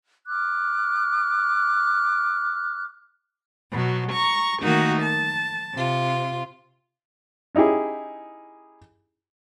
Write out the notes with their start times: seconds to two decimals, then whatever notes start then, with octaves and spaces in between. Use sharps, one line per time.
0.27 D6 F6 F#6
3.70 B2 F#3
4.12 A#5 C#6
4.61 D#3 A3 A#3 D#4 F#4
5.02 A5
5.74 C3 F4
7.55 C#4 D#4 E4 G4 G#4